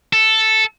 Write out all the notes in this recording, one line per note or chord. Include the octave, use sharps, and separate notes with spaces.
A4